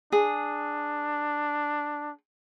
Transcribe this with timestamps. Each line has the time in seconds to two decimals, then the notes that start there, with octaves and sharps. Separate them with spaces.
0.12 D4 G#4